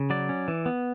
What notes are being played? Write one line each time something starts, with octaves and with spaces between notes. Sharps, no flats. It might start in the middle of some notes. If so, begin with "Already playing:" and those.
Already playing: C#3
F#3 D5
C#4
E3
B3